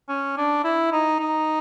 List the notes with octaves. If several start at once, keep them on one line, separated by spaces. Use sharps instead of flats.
C#4
D4
E4
D#4
D#4